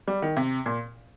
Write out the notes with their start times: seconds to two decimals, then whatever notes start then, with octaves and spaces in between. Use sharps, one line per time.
0.08 G3
0.22 D#3
0.37 C3
0.66 A#2